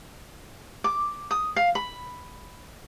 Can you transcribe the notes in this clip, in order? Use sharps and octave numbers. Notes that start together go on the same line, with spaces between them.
D6
D#6
F5
B5